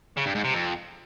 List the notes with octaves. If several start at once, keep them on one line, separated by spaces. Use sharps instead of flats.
C#3
G2
G#2
C3
F2